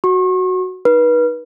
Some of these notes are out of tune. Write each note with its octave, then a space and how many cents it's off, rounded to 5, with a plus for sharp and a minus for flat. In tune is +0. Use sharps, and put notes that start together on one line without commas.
F#4 +0 C#6 -40
D#4 +0 B4 -30